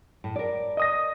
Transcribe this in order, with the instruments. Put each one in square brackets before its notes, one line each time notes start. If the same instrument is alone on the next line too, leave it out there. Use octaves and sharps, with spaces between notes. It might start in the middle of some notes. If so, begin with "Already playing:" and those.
[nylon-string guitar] A2
A#4 D5
[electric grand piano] D#5 D#6 A#6